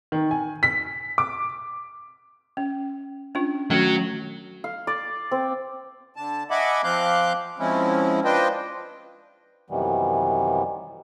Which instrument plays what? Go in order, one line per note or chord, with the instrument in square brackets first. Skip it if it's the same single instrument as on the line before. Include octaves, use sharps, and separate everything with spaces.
[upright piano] D#3
G#5
B6
D6
[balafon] C#4
C#4 D4 F4
[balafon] D#3 A3 C#4 [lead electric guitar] F#3
[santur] F5
D5
C4
[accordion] D3 A5
D#5 E5 F#5 G#5 B5 D6
F3 C4 F5 D6 F#6 G6
F3 G#3 C4 C#4 E4
D4 F4 B4 C5 D#5 G5
F#2 C3 D#3 E3 G3 B3